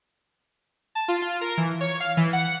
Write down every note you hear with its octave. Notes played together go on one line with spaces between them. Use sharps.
A5
F4
F4
A#4
E3
C#5
F5
E3
F#5